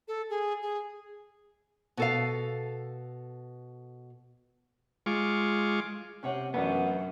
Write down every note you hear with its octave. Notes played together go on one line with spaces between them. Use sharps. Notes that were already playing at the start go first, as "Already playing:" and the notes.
A4
G#4
G#4
B2 A4 F5
G#3 F4 C#6 D6
C3 C#4 C#5 F#5
A1 F#2 B3 D4 F#5